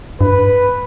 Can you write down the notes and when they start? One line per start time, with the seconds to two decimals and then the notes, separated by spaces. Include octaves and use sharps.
0.21 G2 B4